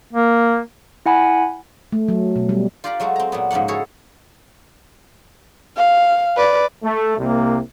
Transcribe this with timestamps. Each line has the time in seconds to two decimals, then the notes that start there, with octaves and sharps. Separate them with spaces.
0.13 A#3
1.06 E4 F#5 G#5 B5
1.92 A3
2.08 F#3
2.36 B2
2.49 G3
2.84 F4 G4 D5 F5 A#5 B5
3.00 F#3 G#3 A3 F#4
3.16 C4 A#5
3.32 A#2 F#3 B3
3.51 G#2 C#3 F3 A#3 F#5
3.68 E4 F#4 G#4 A4 C#5
5.77 F5
6.37 B4 D5
6.84 A3
7.18 C2 C3 A#3